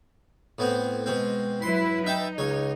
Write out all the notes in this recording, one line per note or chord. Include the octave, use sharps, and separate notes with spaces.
A2 B3 C4
B2 G#3 C4
F#3 E4 B4 C6
D#4 E5 G5 A5
C#2 C#5